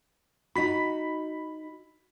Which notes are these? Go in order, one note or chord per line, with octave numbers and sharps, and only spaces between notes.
D#4 F#4 B5 B6